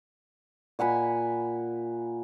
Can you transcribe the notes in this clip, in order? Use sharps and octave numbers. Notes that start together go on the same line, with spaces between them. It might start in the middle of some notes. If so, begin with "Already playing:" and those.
A#2 F#5 G#5 B5